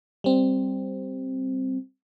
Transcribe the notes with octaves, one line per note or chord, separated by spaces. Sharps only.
G3 C4